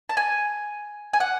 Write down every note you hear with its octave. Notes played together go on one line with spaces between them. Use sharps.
A5
G#5
G#5
F#5